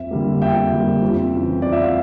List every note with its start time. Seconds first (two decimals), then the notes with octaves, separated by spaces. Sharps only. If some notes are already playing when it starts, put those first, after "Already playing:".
Already playing: F2 E5
0.11 D3 G3 A#3
0.42 F2 E5 G5
0.72 D3 G3 A#3
1.02 F2
1.33 C#3 E3
1.62 F2 D5
1.72 E5
1.83 F5